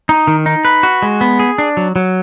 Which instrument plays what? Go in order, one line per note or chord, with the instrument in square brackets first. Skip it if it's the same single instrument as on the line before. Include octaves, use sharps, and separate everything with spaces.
[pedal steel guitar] D#4
D#3
D#4
B4
F#4
G#3
B3
G#4
D4
F#3
F#3